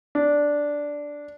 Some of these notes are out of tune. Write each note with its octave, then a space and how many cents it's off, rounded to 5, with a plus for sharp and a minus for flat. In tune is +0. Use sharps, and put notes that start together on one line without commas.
D4 -5